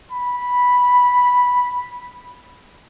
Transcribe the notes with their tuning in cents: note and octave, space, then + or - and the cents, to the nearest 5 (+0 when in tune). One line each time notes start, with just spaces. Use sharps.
B5 -5